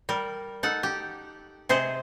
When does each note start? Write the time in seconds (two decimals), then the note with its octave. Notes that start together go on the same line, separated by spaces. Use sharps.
0.09 G3 A#4
0.63 D#4 A4 F#5
0.83 G4
1.69 C3 G#4 C5 D#5